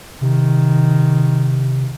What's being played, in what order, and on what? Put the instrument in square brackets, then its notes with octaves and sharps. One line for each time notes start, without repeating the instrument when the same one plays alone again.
[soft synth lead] C3 [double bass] D#3